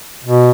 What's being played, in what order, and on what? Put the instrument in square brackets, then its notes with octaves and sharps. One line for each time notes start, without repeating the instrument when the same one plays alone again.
[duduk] B2